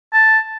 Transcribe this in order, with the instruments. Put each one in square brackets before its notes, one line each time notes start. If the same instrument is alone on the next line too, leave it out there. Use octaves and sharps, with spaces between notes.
[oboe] A5